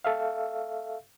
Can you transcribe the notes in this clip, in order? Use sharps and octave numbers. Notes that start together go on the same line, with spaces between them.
A4 E5 F5